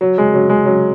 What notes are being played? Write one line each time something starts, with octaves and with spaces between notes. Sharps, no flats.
F#3
G#3
F#3
G#3
F#3